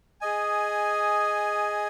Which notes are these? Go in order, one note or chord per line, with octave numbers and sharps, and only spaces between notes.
G#4 D#5 G#5